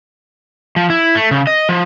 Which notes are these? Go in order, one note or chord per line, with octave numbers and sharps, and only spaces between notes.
F3
E4
A3
C#3
D#5
F3